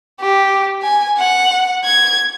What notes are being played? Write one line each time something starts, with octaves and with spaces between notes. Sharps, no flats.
G4
G#5
F#5
G#6